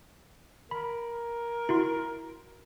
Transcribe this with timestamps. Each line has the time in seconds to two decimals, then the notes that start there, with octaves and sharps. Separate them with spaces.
0.71 A#4 B5
1.69 E4 F#4 C6